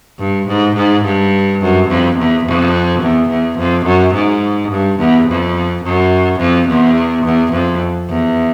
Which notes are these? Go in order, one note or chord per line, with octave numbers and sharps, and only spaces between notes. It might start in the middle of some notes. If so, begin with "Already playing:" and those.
G2
G#2
G#2
G2
F#2
F2
E2
F2
E2
E2
F2
F#2
G#2
G2
E2
F2
F#2
F2
E2
E2
F2
E2